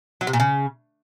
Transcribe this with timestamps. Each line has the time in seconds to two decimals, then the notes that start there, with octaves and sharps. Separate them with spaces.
0.21 F#3
0.27 C3
0.33 A#2
0.40 C#3